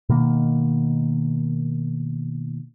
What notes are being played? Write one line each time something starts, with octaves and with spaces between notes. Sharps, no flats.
B2 D#3 A#3